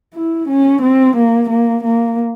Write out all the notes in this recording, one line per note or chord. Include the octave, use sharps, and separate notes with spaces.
E4
C#4
C4
A#3
A#3
A#3